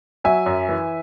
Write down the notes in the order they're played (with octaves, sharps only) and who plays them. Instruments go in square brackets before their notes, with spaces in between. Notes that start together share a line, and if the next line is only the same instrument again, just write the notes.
[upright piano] F#3 E5 G#5
F#2
E3